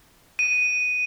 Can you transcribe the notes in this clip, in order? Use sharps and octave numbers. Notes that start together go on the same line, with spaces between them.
D#7